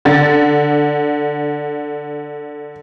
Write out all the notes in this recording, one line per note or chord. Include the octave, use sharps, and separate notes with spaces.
D3 A6